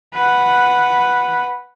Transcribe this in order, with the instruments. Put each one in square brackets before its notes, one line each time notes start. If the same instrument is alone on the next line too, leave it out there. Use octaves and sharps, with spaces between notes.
[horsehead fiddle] B4 F#5